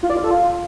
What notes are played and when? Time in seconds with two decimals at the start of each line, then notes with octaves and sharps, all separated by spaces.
0.03 F4
0.10 D5
0.17 F4
0.24 A4
0.31 F4